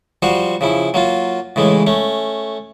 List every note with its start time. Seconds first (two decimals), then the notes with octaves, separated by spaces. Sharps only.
0.22 F3 G3 F#4 C5
0.61 C#3 F3 E4
0.94 F#3 A#3 F4
1.56 A2 C#3 E3 G#3
1.87 A3 C#4